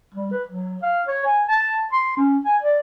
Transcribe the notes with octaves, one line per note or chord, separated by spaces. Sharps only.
G3
B4
F#3
F5
C#5
G#5
A5
C6
C#4
G#5
D5